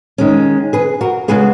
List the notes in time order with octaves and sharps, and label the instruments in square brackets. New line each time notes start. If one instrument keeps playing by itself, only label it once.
[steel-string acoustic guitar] D#3 G#3 C#4
G#4 B4
F#4 A#4
C#3 G#3 B3 G#4 B4